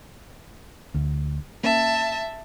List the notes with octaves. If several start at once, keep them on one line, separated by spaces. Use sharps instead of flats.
D2
A#3 C#4 E5 A5